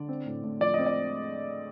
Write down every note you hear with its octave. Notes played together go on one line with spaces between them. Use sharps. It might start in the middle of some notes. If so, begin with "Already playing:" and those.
Already playing: D3 D5
C4
A2
A2
F3 D5
C4 D#5
D5